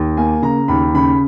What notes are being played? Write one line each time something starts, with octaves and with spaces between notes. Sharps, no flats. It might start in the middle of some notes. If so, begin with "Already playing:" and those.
Already playing: D#2
A#3 G#5
C#3 A#5
D#2 B5
C#3 B5